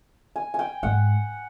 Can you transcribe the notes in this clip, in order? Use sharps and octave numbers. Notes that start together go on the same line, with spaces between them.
G#5
G#5
G5
G#2 F#5